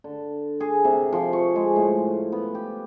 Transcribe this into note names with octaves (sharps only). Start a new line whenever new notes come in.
D3
G#4
C3
F3
C#6
G#3
A2
B3
G4